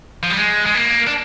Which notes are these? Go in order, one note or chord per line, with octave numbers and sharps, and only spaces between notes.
F3
G3
G#3
G#3
A#3
D4